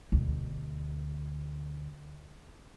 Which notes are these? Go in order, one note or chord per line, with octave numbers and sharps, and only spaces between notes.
D2 B2